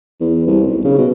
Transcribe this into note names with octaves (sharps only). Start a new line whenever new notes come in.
E2
C2
B1
C#3
B2